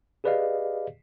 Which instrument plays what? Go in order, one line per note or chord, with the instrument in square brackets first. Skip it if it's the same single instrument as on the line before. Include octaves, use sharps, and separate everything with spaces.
[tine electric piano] G4 G#4 B4 D5 D#5 F5